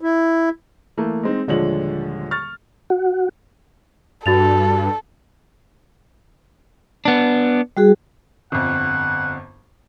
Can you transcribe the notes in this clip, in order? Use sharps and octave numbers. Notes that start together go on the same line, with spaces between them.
E4
E3 A3 A#3
G#3 C4 D#4
D#1 D3 F3 G#3 C#5 F#7
C#6 F6 A6
F#4
G2 F#4 A4 A6 F7
B3 D4
G3 F#4 G#4
G1 F2 F#5